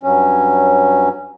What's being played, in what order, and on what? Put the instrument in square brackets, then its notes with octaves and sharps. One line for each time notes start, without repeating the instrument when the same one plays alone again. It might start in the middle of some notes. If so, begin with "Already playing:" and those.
[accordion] G2 F#3 C#4